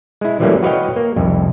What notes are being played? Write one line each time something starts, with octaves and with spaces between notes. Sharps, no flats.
G#3 E4
E3 F#3 G3 A3 A#3 C#4
F#4 B4 C#5 D#5 F5 G5
A#3
C2 F2